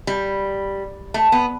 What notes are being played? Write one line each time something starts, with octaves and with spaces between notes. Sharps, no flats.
G3
A3
B3